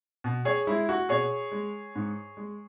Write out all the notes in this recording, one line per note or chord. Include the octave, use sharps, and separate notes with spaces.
B2
G#4 C#5
G#3 E4
F#4
B2 G#4 C#5
G#3
G#2
G#3